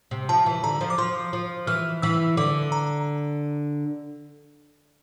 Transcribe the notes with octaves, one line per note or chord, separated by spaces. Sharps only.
C3
F3 A5
E3
D3 A#5
F3
D6
F3 C6
F3
E3 F6
E3 E6
D3 D6
A#5